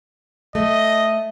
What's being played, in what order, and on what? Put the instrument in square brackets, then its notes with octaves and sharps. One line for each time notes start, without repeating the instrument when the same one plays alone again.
[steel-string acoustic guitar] A3 [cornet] D#5